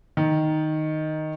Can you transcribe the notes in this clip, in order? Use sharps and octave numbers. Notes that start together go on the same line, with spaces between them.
D#3